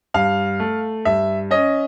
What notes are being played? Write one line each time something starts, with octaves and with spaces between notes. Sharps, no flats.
G2 F5
A3
G2 E5
C#4 D#5